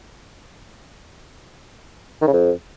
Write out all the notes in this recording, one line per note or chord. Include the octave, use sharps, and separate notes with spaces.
D#3
C#3
F2